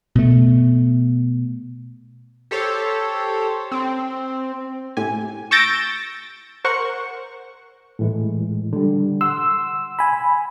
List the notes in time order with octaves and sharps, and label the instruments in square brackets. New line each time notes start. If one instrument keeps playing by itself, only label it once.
[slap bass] B2 A3
[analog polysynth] G4 A4 C5 C#5
C4
[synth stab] A2 G4 G#5
C#6 E6 G6 A6 A#6 D7
A#4 C5 F#5 C#6
[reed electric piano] A2 E3 G#3
D3 G3
[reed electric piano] F#5 C6 [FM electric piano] E6
[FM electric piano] G#5 B5